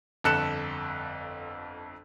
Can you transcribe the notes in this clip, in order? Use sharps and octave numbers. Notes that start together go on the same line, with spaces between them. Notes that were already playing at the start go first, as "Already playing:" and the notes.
G1 F2 A4 F#6 C#7 E7